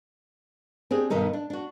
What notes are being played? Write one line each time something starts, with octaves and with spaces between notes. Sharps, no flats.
C4 D4 G4 G#4
G2 B2 D#3 D#4 A4
D4
D4 F#4